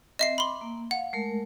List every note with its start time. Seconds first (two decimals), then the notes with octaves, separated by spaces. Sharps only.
0.19 C4 D#5 E5 C7
0.38 B5 C6 D6
0.61 A#3
0.91 F5 F#5
1.13 G#3 A3 A#4